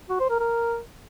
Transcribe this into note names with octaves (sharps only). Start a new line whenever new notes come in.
F#4
C5
A#4
A#4